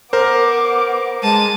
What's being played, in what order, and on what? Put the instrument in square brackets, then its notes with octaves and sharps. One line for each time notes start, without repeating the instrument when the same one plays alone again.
[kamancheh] B3 D6 [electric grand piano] A#4 C5
[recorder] G#3 [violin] A5 D#7